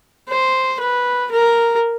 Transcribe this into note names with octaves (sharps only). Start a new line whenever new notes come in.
C5
B4
A#4